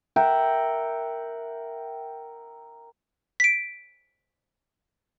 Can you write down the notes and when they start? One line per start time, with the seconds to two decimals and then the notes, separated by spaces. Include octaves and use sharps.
0.16 A#4 E5 F#5 G5
3.40 B6 D7